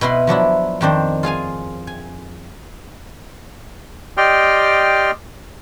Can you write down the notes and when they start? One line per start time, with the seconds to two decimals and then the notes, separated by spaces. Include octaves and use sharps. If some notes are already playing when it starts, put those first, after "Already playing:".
0.01 B2 E4 B4 D#5 C6
0.27 F3 F#3 D4 E4
0.81 F2 D#3 D4 C5
1.23 F4 G#4 F5 G#5
1.87 G#5
4.17 G4 D5 D#5 G5 C6 F6